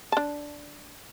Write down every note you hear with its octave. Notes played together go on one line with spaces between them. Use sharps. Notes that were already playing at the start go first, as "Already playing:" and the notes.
D4 A5